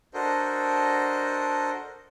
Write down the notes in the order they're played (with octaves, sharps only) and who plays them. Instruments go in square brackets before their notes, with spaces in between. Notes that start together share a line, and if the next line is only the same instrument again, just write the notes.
[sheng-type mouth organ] D4 F#4 A4 A#4 C5 D#5